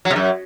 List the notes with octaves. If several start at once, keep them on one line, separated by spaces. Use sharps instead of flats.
F#3
C3
F#2